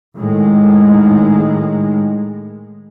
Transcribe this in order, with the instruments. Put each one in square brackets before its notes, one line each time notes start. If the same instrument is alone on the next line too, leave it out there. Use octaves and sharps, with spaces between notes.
[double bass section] A2 D#3 G#3